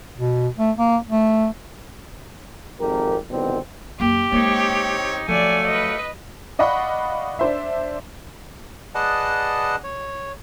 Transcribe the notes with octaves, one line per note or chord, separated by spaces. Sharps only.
B2
A3
A#3
A3
G#1 F2 G4 A#4
C2 B2 D3 D#3 C4
F#2 A#3 G4
G#3 A#3 C4 D#4 C#5
F3 F#3 A3 F4 D5 G#5
B4 D#5
D5 D#5 F5 F#5 B5 C#6
D4 C5 E5
G#4 B4 D5 D#5 F#5 A5
C#5